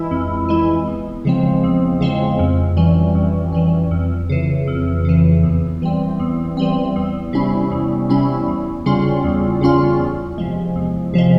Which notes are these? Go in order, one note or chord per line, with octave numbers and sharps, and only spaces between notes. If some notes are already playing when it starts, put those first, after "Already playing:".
Already playing: E3 G#3 E4
F2
E3 G#3 E4
E2
C#3 F3 G#3 C4
E2
C#3 F3 G#3 C4
F2
E3 G3 C#4
F2
E3 G3 C#4
F2
C#3 E3
F2
C#3 E3
E2
E3 G3 C4
E2
E3 G3 C4
E2
C3 G3 C#4 E4
E2
C3 G3 C#4 E4
E2
C#3 G3 C#4 F4
E2
C#3 G3 C#4 F4
E2
C3 F3 G#3
E2
C3 F3 G#3